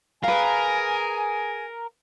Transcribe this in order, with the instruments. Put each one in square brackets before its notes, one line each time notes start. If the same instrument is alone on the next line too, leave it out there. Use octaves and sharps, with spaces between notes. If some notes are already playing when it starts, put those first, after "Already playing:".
[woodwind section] G#4 G#5 [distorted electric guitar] A#4 [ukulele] B4 F5